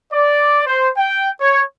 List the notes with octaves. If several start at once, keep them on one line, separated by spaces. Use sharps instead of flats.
D5
C5
G5
C#5